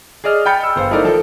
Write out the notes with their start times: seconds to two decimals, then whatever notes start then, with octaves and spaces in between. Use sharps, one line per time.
0.24 G#4 D5 D#5 F6
0.46 G5 G#5 B5 G6 A6 C#7
0.63 E6
0.76 G1 C5 F5
0.90 A3 D#4 E4 A4 A#4 D5
1.04 F3 A4